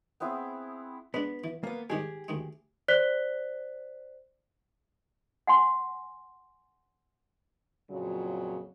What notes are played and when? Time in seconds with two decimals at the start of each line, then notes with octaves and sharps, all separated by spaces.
0.20 B3 C4 E4 G#4
1.14 G#3 B3 D4
1.44 E3
1.63 A#3 B3
1.90 G#2 D#3 G3 G4 G#4
2.28 D2 D#3 G#3
2.88 C5 D5 F#6 B6 G7
5.47 F#5 G#5 C6
7.90 F2 A#2 C#3 F#3